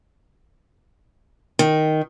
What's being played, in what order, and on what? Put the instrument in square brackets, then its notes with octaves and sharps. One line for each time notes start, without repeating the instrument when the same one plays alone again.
[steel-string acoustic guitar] D#3